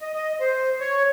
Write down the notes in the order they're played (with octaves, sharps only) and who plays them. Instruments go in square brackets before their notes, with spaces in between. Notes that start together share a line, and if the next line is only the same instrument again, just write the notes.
[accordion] D#5
D#5
C5
C#5